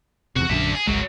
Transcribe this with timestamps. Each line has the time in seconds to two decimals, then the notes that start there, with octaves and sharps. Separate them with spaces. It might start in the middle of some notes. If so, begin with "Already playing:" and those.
0.36 E2 G2 C3 F#4
0.50 A#1 F#2 D3 D4 E5
0.75 G#4
0.87 G#1 C#2 F#2 F#3 G#3